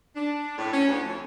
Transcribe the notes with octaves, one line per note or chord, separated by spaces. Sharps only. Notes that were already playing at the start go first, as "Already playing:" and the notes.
D4
A2
C#4
D2
F2